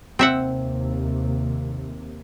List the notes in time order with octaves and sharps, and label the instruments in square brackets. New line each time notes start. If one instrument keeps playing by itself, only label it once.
[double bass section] D#2 C3 [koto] C4 E5 F#5